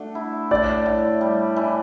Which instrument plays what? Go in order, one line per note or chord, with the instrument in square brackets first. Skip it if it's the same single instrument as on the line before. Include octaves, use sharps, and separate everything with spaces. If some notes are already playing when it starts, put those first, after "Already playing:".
Already playing: [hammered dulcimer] A3 D4 F#4
E4
[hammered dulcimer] A2 [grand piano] D5
[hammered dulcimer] A2
G3
E3